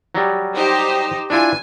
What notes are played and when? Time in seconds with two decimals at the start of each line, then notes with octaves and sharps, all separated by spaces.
0.15 F#3 G3
0.54 D#4 G4 C5
1.30 D4 E4 F4 G#5